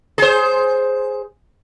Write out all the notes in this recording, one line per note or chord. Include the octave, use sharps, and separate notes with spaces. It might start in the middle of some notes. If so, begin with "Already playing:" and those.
G#4 C5